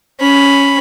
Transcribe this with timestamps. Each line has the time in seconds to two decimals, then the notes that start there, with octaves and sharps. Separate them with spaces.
0.20 C#4 B5